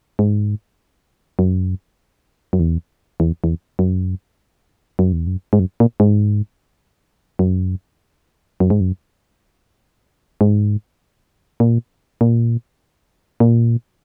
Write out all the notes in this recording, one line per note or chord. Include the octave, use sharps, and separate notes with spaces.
G#2
F#2
F#2
E2
E2
E2
F#2
F#2
E2
F#2
G#2
F#2
A#2
G#2
F#2
F#2
G#2
F#2
G#2
A#2
A#2
A#2